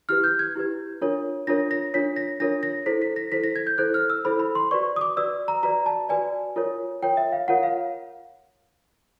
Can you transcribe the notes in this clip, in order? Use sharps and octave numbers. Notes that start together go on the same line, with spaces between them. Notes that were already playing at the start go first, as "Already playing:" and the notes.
E4 G4 B4 F6
G6
G#6
E4 G4 B4
D4 F4 A#4 C#5
D4 F4 A#4 C#5 A#6
A#6
D4 F4 A#4 C#5 B6
A#6
D4 F4 A#4 C#5 A#6
A#6
E4 A4 C5 B6
B6
A#6
E4 A4 C5 B6
A#6
G#6
G6
E4 A4 C5 F#6
F6
E6
E4 A4 C5 B5
B5
C6
F#4 B4 D5 C#6
D#6
D6
F#4 B4 D5 E6
A#5
F#4 B4 D5 A#5
A5
F#4 B4 D5 G#5
F4 A#4 C#5
F4 A#4 C#5 G5
E5
F5
F4 A#4 C#5 F#5
F5